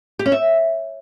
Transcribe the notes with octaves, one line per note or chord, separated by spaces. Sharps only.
G4
C#4
E5